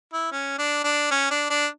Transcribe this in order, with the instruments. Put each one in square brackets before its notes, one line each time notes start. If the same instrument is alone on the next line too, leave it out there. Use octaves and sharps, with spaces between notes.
[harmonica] E4
C#4
D4
D4
C#4
D4
D4